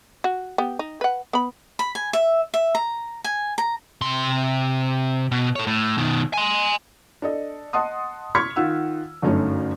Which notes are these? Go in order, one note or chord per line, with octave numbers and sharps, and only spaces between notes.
F#4
B3 G4
D#4
B4 F#5
B3 B5
B5
G#5
E5
E5
A#5
G#5
A#5
C3 C6
B2
A4 C#5
A2
B2 D#3
G#5 C6
D4 A4 D#5
D#5 F#5 A5 C6 D#6
C6 C#6 F6 G#6 B6
D#3 F4 F#5 E6
G1 F#2 A3 C#4 D#4